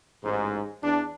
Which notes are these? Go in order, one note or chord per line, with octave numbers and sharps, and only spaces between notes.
A1 G#2
E2 D4